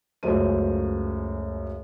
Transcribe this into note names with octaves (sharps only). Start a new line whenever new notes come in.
C#2 F#2 A3 C5 D#7